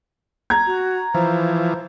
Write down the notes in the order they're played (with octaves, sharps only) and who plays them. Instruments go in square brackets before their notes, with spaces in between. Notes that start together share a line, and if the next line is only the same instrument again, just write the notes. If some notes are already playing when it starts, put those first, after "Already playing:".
[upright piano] A#5 G#6
[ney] F#4
[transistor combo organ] E3 F3 [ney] C5